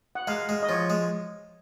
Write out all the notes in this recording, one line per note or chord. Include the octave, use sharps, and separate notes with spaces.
F#5
G#3 F5
G#3
D#5
F3 C#5
G#3